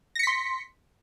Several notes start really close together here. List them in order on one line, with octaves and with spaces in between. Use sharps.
A#6 C#7 B6 C6